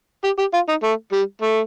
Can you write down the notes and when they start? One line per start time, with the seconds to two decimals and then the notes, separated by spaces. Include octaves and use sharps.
0.24 G4
0.38 G4
0.53 F4
0.68 D#4
0.83 A3
1.12 G3
1.42 A3